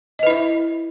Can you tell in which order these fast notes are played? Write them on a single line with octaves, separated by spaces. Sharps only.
D#5 B4 E4 E5